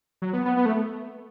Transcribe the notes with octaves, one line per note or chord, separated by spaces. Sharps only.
F#3
B3
B3
B3
A3